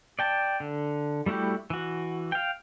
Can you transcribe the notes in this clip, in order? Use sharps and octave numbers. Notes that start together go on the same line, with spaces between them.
D5 G5 A5
D3
G3 A3 E4 F#4 G4
E3 F#4
F5 G5